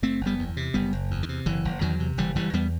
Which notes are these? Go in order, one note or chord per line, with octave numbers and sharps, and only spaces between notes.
F#1 A3 C4
F#1
G3 B3
E2
C3
F#1 G3 B3
F#1
E2
D#3
C3
F#1 E3
F#1
E2 D#3 F#3
C3
F#1 E3 G3
F#1 E3 G3
E2 G3 B3